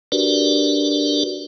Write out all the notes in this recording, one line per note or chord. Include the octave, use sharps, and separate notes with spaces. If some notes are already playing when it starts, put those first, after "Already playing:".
D4 F#4 G4 A#4 B4 D5